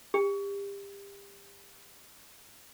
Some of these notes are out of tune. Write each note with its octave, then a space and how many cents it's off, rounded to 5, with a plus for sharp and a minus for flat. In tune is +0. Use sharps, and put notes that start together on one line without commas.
G4 +30